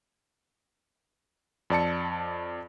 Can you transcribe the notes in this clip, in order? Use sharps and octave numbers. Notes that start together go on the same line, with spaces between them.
F2 D5 A5 C#7